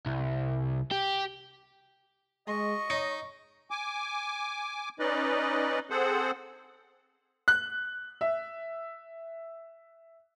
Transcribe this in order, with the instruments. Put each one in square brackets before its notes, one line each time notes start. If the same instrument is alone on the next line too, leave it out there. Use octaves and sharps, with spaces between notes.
[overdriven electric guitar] C2
G4
[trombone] G#3 [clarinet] D#5 [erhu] C#6
[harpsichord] D#4 [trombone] C#5
[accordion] G#5 D6
C#4 D#4 B4 D5 D#5
C4 G#4 A4 C5 F#5
[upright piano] F#6
E5